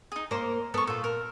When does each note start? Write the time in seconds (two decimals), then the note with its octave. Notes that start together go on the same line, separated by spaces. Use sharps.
0.12 D#4 G#4
0.31 A#3 C5 A#5 C6
0.74 B3 A4 C#6
0.87 A#2 F4 A4
1.04 A#4